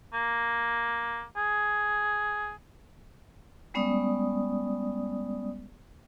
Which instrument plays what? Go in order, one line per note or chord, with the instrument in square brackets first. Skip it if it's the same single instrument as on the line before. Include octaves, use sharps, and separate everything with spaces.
[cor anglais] A#3
G#4
[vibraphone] G3 G#3 B3 C#4 D5 D#6